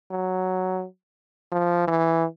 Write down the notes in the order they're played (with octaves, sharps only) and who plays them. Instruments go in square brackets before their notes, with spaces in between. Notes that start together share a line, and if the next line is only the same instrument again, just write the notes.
[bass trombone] F#3
F3
E3